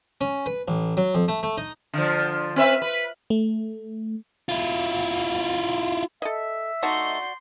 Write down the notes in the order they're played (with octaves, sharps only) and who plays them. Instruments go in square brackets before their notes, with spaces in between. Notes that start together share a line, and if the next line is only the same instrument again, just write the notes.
[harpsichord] C#4
B4
A1
F#3
F2
A3
A3
D#4
[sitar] D3 F3
C4 B4 E5
B4
[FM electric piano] A3
[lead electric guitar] E4 F4
[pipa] A4 D#5 [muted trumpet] E5
[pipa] A3 D#4 A5 [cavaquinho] F#4 D5 [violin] C6 G6